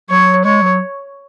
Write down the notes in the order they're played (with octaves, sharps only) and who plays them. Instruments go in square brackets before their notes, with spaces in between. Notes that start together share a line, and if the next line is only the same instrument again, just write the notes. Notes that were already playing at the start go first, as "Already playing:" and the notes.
[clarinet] F#3 [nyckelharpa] C#5
[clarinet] G#3 [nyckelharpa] C#5
[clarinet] F#3